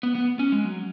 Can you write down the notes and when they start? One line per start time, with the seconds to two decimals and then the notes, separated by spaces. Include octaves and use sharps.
0.03 B3
0.15 B3
0.39 C#4
0.52 G#3
0.65 F#3